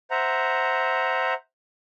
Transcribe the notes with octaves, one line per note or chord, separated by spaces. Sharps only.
C5 E5 F#5 A#5